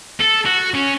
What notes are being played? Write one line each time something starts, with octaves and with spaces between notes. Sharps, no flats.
A4
F#4
C#4